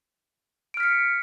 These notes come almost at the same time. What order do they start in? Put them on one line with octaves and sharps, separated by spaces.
D7 F6 B6 C#7